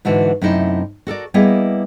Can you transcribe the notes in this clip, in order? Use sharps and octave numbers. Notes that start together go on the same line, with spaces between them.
G#2 D3 E3 F#4
F#2 C3 A3 D#4 E4
F#4 A4 A#4 D5
G3 A#3 B3 E4 G#4 D#5